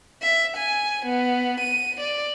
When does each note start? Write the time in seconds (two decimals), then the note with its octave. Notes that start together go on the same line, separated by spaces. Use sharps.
0.22 E5
0.56 G#5
1.05 B3
1.60 D#7
2.00 D5